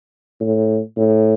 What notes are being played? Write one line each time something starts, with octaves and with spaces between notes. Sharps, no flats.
A2
A2